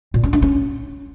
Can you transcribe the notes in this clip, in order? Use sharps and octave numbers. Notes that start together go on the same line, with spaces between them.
A#2
C#4
D4
C#4